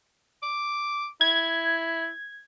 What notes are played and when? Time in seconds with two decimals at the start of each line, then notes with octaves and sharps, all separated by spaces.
0.43 D6
1.21 E4 G#6